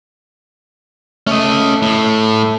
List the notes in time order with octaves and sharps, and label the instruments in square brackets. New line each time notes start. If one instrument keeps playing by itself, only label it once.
[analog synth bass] A3 [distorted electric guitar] C#4 D#5
[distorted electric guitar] A2